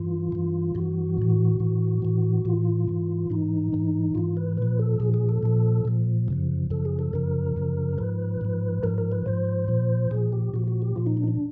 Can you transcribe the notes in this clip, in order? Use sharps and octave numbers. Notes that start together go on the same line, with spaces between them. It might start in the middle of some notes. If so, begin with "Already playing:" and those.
Already playing: G2 E3 F4
G2 E3
G2 E3 F#4
A2 E3
A2 E3
A2 E3
A2 E3 F4
G#2 E3
G#2 E3 D#4
G#2 E3
G#2 E3 F4
B4
A#2 F3 B4
A4
A#2 F3 G#4
G#4
A4
A#2 F3
A#2 F3
F#2 C#3 F3
F#2 C#3 F3 A4
G#4
A4
F#2 C#3 F3 A#4
F#2 C#3 F3
G#2 F3 B4
G#2 F3
G#2 F3 A#4
A#4
B4
G#2 F3 C5
A#2 F3
A#2 F3 G#4
G4
A#2 F3 F#4
F#4
G4
A#2 F3 F4
D#4
D4
D#4
D4